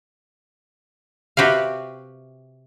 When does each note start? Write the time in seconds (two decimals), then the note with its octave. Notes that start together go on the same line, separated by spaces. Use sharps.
1.37 C3 F#4 G4 B4 F5